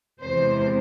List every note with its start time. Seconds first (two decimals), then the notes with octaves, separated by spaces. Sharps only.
0.21 E2 C3 E3 G#3 C5